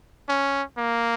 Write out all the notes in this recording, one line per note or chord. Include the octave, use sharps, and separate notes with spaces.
C#4
A#3